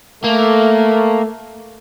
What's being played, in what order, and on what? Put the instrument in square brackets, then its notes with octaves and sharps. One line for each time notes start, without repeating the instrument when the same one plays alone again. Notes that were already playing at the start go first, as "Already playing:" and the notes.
[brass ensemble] A3 [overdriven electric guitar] A#3